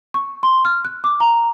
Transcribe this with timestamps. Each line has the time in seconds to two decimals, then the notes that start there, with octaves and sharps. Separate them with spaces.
0.14 C#6
0.43 C6
0.65 F6
0.85 F#6
1.04 D6
1.20 A#5